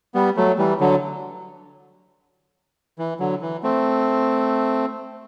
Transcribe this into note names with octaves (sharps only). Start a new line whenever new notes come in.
G3 B3
F#3 A3
E3 G3
D3 F#3
E3
D3 F#3
E3
A3 C4